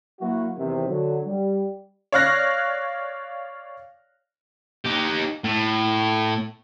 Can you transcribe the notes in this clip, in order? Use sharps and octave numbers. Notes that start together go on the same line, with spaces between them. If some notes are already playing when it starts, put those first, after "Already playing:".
F#3 A#3 E4 F#4
E2 C3 D#3
D3 F#3
G3
C#5 D5 F5 F6 F#6 A#6
D#4 G4
A2